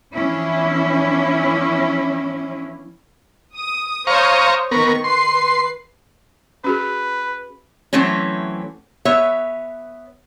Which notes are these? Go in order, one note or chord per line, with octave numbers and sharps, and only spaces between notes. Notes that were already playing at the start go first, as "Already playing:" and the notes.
E3 F3 B3 C#4 D4 E4
D#6
C5 C#5 F5 A#5 C#6 D#6
D#3 B3 A#4 C#6
B4 C6 C7
C#4 F#4 G#4 B4
E3 F#3 A3 C4 C#4
B3 C#5 E5